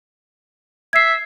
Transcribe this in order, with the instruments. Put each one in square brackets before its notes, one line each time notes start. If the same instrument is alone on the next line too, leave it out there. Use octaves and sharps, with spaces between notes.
[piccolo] E5 [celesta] G#6 C7